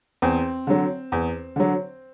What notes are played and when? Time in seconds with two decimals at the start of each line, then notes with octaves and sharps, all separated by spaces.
0.22 E2 C4
0.67 D3 F#3
1.12 E2
1.56 D3 F#3